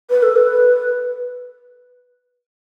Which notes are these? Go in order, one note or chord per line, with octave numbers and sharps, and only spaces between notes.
B4
A4
B4